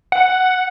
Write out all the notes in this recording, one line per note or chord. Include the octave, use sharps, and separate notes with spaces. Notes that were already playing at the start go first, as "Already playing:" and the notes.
F#5